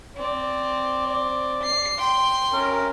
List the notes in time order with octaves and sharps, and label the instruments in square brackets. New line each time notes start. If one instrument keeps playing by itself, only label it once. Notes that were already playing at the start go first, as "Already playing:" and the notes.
[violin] C4 [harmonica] D5
[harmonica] D5
[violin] C7
G5 C6
[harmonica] C#4 A#4